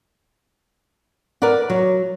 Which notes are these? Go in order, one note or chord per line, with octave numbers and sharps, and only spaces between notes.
A#4 B4 D5 F#5
F#3